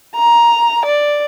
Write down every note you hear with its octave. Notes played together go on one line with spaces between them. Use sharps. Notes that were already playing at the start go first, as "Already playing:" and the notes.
A#5
D5